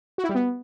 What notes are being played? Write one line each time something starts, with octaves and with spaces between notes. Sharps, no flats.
F#4
E4
G3
B3